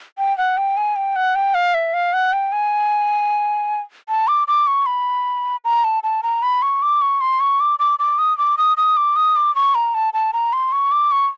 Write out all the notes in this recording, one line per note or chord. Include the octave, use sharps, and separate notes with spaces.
G5
F#5
G5
G#5
G5
F#5
G5
F5
E5
F5
F#5
G5
G#5
A5
D6
D6
C#6
B5
A#5
A5
A5
A#5
B5
C#6
D6
C#6
C6
C#6
D6
D6
D6
D#6
D6
D#6
D#6
D6
D#6
D6
C#6
A#5
A5
A5
A#5
C6
C#6
D6
C#6